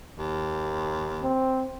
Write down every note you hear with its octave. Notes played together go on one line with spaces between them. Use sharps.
D#2
C4